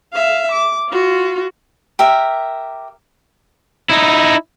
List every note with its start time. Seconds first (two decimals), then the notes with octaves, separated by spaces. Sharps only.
0.12 E5 F5
0.52 D6
0.89 F4 F#4
1.99 G4 A#4 E5
3.90 D#4 E4